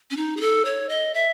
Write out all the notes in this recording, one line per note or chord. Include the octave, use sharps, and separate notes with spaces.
C#4
D#4
G#4
A4
C#5
D#5
E5